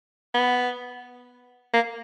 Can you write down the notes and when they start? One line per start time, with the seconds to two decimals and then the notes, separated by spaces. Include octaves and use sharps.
0.34 B3
1.74 A#3